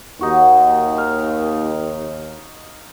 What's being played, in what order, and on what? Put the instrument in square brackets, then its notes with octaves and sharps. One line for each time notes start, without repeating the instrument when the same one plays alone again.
[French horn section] D#2 [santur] D#4 F#4
[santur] F5